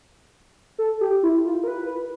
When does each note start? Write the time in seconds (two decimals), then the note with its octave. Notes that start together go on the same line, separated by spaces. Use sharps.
0.79 A4
1.01 G4
1.23 E4
1.45 F4
1.63 A#4
1.68 B4